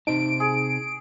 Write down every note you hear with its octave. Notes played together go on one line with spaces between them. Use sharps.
C3 D#4 C5 A5 D7
G#4